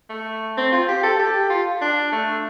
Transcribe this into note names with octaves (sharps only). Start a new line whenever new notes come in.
A3
C4
F4
G4
A4
G4
F4
D4
A3